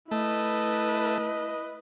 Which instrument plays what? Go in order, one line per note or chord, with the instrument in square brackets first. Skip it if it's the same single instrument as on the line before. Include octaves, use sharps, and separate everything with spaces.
[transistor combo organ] A3 [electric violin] E4 B4 [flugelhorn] D#5